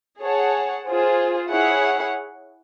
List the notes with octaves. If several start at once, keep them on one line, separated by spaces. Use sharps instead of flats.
G#4 C#5 F#5 A5
F4 G#4 C5
E4 G#4 C#5 F#5